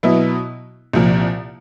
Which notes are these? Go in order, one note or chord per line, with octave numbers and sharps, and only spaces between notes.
B2 F#3 B3 E4
C2 A#2 F3